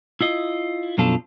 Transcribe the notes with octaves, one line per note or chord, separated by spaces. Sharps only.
E4 F4 D#5
F#2 B2 F3 D4 F4 A4